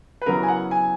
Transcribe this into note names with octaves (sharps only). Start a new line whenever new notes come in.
B4
C#3 F#3 B3 E4 A#4
G#5
F#5
G#5